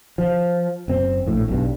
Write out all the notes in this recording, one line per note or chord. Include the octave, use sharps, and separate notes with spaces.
F3
F#1 C4
A#1 A2
B1 G2